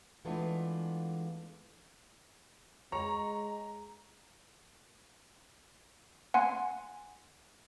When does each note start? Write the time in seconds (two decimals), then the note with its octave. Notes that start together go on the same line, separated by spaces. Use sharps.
0.25 E3 G#3 A3 B3 D4 F4
2.92 G#3 C#5 A#5
6.34 F#5 G#5 C6